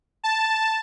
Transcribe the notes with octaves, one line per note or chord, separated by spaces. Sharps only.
A5